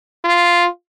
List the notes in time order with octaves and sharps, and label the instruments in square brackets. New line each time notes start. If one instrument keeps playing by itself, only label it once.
[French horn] F4